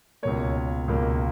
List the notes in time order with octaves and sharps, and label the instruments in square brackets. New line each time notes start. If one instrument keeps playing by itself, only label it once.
[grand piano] C#2 B2 A#3 C#5
C#2 B2 A#3